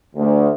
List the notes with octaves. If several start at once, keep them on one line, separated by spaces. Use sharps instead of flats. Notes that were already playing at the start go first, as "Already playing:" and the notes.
D2